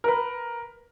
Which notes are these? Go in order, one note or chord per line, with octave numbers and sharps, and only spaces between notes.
A#4 B4